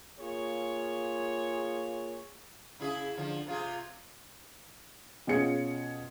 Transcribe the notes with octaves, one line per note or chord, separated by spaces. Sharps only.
A#3 F4 G#4 C#5
C#3 E4 G#4
D3 F3
C3 F4 G#4
B2 C#4 F4 G#4 C#7